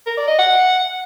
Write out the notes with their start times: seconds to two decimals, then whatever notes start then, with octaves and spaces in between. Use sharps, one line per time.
0.07 A#4
0.17 D5
0.28 D#5
0.38 F#5